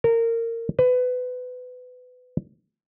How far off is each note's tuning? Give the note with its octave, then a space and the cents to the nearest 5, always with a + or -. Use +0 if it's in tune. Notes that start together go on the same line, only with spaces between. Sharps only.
A#4 -20
B4 +25